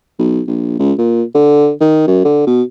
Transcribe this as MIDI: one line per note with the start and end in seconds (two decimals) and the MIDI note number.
0.19 0.42 35
0.48 0.78 34
0.79 0.93 37
0.98 1.23 46
1.35 1.71 50
1.80 2.06 51
2.07 2.20 42
2.24 2.45 50
2.47 2.62 47